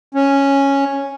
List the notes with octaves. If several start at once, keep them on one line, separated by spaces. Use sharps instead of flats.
C#4